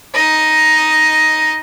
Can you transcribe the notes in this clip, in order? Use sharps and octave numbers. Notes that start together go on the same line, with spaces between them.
D#4 D#5